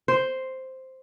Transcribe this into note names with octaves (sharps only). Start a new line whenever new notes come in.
C5